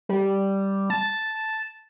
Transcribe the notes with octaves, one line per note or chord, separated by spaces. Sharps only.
G3
A5